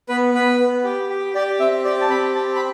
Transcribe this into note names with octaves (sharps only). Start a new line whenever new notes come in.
B3 B4
B3 B4
B3
G4
G4
G4 D5
C4 E5
G4 D5
A5
C4 B5
G4 A5
B5